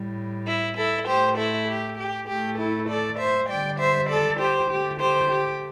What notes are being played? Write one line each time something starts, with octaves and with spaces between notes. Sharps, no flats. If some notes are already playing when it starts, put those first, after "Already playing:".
Already playing: A2 G3
E4
E4 A4
A2 A3 G4 C5
E4 A4
G4
G4
A2 A3 G4
E4 A4
A4 D5
C5 E5
D3 G3 D5 G5
C5 E5
A4 D5
G4 C5
D3 A3 G4
G4 C5
G4